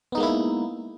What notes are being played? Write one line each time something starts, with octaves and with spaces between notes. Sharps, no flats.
G#3 A#3 B3 D#4 E4